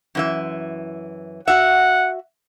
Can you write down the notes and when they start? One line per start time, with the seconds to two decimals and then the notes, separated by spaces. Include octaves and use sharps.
0.15 F#2 E3 E5
1.48 F#4 E5 F#5